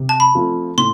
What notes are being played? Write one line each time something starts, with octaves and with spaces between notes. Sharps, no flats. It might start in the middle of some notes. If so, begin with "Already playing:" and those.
Already playing: C3
A5
B5
F3 A3 C4 F4
A2 C6